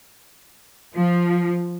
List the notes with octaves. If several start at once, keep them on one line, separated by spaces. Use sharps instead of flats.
F3